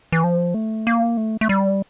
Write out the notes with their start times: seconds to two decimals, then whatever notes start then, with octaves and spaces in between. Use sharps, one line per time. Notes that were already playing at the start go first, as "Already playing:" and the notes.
0.12 E3
0.23 F3
0.54 A3
0.87 A#3
1.17 A3
1.41 A3
1.49 G3